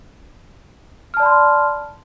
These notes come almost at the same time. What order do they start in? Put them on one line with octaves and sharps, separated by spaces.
F6 A5 D5 B5 C6